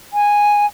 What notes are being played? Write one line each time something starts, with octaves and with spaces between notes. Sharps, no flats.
G#5